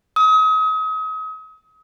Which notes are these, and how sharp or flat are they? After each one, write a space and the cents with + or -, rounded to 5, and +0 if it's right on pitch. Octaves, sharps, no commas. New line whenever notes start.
D#6 +35